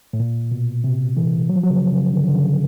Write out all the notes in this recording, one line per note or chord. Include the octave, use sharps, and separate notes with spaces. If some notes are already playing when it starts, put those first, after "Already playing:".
A2
A#2
B2
C3
E3
F#3
F3
F#3
C#3
C#3
D3
D3
C#3